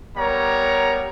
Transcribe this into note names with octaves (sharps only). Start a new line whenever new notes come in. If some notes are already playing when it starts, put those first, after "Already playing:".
G3 B3 A#4 C#5 A#5